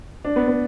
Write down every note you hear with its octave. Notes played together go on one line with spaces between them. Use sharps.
D4
B3
B3